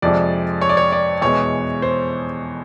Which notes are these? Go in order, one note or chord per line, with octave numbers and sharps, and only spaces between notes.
F2 C3 F3 G#3 D5
C#5
D5
C#5
D5
E2 B2 G#3 C#5
C5